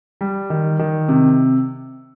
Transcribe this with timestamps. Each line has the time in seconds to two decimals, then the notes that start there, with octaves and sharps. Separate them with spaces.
0.21 G3
0.50 D#3
0.79 D#3
1.08 C3